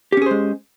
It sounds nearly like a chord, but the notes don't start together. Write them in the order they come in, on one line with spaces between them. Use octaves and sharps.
G4 C#4 G#4 C5 G#3